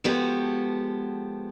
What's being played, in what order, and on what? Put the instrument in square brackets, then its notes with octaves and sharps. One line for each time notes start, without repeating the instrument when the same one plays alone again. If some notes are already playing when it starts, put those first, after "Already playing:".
[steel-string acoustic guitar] F3 G#3 B3 F#4 G4 A4